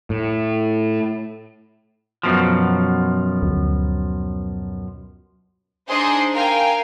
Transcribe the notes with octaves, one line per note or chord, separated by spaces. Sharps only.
A2
F#2 B2 F3
D2
D4 D#4 G#4 C5 D#5 C6
A#4 F5 G5 G#5